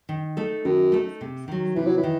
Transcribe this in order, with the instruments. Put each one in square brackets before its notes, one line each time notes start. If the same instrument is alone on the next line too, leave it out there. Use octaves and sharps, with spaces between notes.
[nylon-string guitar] D#3
A3 D#4 A4
[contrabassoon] F#2 [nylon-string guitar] D#3
[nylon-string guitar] A3 D#4 A4
C3
D#3 F#3
[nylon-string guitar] C3 [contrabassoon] E3
[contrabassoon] F#3
E3
[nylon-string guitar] D#3